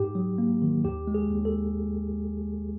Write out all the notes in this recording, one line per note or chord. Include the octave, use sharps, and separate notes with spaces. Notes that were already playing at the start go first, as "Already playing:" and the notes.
Already playing: G#2 G4
F#3
A#3
D#3
D#2 G4
G#3
G#4
D#2
A4